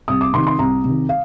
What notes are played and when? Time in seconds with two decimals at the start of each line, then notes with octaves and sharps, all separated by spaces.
0.08 C2 D#6
0.21 D6
0.33 C3 D#3 C6
0.47 C6
0.59 C2 A#5
0.84 C3 D#3
1.09 F5